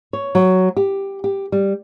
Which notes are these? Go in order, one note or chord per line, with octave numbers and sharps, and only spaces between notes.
C#5
F#3
G4
G4
G3